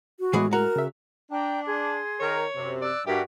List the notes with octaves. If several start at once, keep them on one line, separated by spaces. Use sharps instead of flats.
F#4
A2 E3 G#3 B3 G#4
F#4 A#4 A#5
C#3 E5
D4 G5 A#5
G#4 C6
D#3 A#4 C#5
F#2 C3
D5 E6 F#6
G2 F#4 G4 A#4 E5